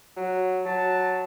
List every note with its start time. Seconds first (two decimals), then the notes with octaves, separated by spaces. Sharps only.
0.16 F#3
0.66 F#3 A5